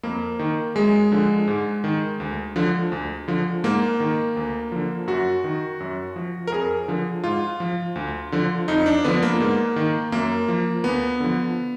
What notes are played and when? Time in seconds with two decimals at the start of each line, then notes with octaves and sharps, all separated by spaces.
0.03 F2 A#3
0.39 D#3
0.75 F#2 G#3
1.12 D3 F3
1.48 G#2
1.84 D#3
2.20 D2
2.56 D3 F3
2.92 D2
3.28 D3 F3
3.64 G#2 A#3
4.00 D#3
4.36 D2
4.72 D3 F3
5.07 F#2 F#4
5.44 D#3
5.80 F#2
6.16 F3
6.47 A#4
6.52 F2 G#4
6.88 D3 F3
7.24 G#2 F4
7.60 F3
7.96 D2
8.32 D3 F3
8.68 F2 D#4
8.86 D4
9.04 D3 F3 B3
9.22 A#3
9.40 G#2
9.76 D#3
10.12 F#2 A#3
10.48 F3
10.84 D2 B3
11.20 D3 F3